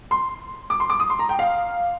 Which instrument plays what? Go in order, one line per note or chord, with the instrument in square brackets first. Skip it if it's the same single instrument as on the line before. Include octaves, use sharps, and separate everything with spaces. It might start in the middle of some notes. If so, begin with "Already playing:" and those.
[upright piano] C6
D6
C6
D6
D#6
C6
A#5
G5
F5